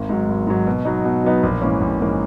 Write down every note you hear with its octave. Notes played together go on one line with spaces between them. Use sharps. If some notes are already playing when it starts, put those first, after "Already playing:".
Already playing: G#1
G#2 F#3
G#1
G#2 F#3
B2
F#3 B3 D#4
B2
F#3 B3 D#4
A#1
G#2 E3 A#3 C#4
A#1
G#2 E3 A#3 C#4